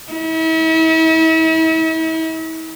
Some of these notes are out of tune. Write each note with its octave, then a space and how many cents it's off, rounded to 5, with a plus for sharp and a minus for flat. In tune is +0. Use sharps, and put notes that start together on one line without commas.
E4 -40